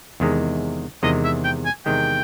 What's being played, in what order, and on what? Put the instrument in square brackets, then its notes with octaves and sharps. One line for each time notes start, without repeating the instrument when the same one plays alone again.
[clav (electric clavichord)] E2 C3 D#3 G#3
[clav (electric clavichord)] E2 C3 D#3 G#3 [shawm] D#5
[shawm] E5
G5
G#5
[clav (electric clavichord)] E2 C3 D#3 G#3 [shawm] G5